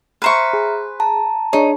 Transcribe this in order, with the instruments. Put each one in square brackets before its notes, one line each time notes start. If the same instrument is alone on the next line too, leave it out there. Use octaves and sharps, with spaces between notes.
[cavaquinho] B4 C5 C#6 [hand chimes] E5 A#5 F6
[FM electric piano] G#4
[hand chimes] A5 A#5
[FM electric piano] D4 G#4 C#5 [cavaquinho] D#4